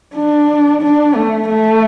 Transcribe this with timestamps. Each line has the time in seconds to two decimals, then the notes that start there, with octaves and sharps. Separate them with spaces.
0.15 D4
0.82 D4
1.15 A3
1.48 A3